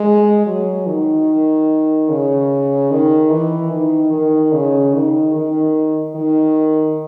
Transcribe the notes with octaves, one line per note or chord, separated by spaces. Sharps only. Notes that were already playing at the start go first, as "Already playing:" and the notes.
Already playing: G#3
F#3
D#3
C#3
D#3
E3
D#3
D#3
C#3
D#3
D#3
D#3